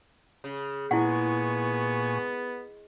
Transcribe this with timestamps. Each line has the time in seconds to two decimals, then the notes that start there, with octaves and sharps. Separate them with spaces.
0.44 C#3
0.91 A#2 G#3 B3 E4 F#5 G#5 C#6